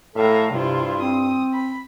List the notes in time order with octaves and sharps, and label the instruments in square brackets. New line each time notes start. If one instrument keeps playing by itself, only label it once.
[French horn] A2 [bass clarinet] A4 [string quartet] E5 F5 A#5
[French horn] G2 [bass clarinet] C3 [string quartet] E4 F4 C5
[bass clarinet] C4 [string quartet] D#6
[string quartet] B5